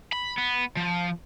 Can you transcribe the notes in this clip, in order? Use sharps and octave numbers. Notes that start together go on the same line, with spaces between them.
B5
B3
F3